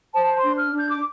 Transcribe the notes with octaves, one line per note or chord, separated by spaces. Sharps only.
C5 A5
A5
C6
D4
F6
D4
G6
D6